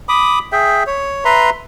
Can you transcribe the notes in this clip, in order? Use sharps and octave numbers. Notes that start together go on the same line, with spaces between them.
B5 D6 D#6
G#4 E5 G5
C#5
B4 E5 A#5 C6